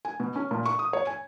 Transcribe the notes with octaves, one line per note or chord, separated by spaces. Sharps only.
G#5
B2
C#4
A#2
C#6
D#6
C#5
G#5